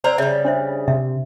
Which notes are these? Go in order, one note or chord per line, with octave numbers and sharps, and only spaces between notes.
C4 C5 D5 F5 A#5
C#3 G3 C#5 E5
D4 C5 E5
C3 E5